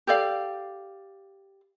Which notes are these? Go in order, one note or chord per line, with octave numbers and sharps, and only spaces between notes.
G4 A4 D5 F5